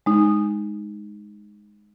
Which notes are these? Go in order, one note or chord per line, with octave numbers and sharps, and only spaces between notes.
G#3 D#4